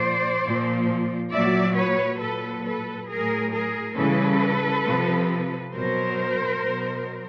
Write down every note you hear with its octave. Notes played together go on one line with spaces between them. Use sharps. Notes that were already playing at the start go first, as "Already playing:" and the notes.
Already playing: A#2 F3 C5 D5
A#2 F3
A#2 F#3 D5 E5
B4 C#5
A#2 F#3 A4 B4
A4 B4
A2 F#3 G#4 A#4
G#4 A#4
C#3 E3 G3 A4 B4
C3 F3
B2 F#3 A#4 C5
B2 F#3